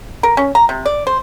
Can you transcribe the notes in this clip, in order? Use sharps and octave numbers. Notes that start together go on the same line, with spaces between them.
A#4
C#4
A#5
C3
D5
C5